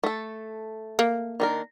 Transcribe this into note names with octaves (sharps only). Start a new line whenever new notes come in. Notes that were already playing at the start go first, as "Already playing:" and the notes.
A3 A4
A#3
D#3 D4 A#4